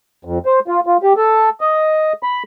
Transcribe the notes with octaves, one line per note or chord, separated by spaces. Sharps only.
F2
C5
F4
F4
G4
A4
D#5
B5